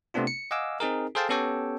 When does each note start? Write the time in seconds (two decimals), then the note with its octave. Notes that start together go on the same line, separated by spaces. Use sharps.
0.14 C3 A3 B3 C4 D4 F4
0.27 C#7
0.51 D#5 F5 F#5 G#5 D6 E6
0.80 C4 D#4 G#4 A#4
1.15 G#4 A4 C5 F5 G5 A5
1.29 B3 C#4 G4 A4 C#5 G5